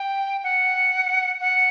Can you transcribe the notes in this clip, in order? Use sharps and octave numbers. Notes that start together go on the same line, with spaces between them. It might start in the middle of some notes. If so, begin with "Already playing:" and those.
Already playing: G5
F#5
F#5